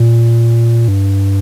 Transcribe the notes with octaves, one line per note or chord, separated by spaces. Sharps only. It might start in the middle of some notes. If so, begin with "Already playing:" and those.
Already playing: A#2
G2